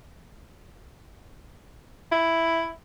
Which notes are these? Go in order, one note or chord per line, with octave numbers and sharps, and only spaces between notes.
E4